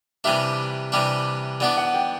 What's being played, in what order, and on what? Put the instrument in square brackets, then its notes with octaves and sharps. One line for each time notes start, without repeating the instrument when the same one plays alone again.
[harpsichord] C3 E3 G3 D4 [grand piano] E5
[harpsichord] C3 E3 G3 D4
[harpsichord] E3 B3 D4 [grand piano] D5
[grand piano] F#5
G5